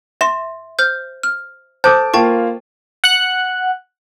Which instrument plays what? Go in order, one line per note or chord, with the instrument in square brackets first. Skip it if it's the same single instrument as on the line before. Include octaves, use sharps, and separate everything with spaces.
[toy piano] E5 [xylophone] C6 A#6 E7
[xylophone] C5 F6 G6
F6
[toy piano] A4 C5 [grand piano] A5 D6 [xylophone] G6
[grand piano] A#3 F4 [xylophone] G5 A5 C#6
[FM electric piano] F#5 F#6